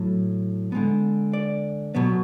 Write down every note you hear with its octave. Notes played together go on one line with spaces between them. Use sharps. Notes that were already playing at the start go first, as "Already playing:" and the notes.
Already playing: A2 F#3
D3 G#3 B3
D5
B2 F#3 B3